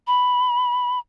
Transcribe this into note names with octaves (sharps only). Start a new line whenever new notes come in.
B5